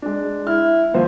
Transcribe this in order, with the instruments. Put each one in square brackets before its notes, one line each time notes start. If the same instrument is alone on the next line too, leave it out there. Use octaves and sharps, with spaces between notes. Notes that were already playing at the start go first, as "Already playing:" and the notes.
[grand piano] G#3 D4
[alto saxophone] E4 [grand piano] F6
[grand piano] D#2 F3 C5 [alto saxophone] A#3